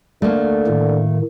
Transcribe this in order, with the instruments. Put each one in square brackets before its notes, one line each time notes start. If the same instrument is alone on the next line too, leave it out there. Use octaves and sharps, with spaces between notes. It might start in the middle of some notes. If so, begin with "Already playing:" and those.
[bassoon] D3 [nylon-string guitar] A3 A#3
[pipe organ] A2 D#3